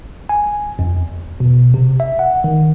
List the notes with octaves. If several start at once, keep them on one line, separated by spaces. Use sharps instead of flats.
G#5
F2
E2
B2
C3
E5
F#5
D#3